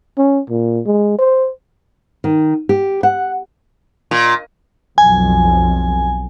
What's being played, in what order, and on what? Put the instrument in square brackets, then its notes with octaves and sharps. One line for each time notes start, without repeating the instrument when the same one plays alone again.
[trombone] C#4
A#2
G#3
C5
[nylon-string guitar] D#3
G4
F#5
[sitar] A#2
[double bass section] B1 F2 [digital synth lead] G#5